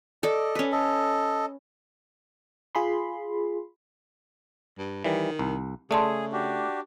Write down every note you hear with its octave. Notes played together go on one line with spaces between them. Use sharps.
A4 D5 D#5
C#4 B4
A4 D#5
F4 G#4 B5 C6
G2
D#3 E3 G3
C2
C#3 A3 G#4 D5 A5 C6
D4 F#4 G4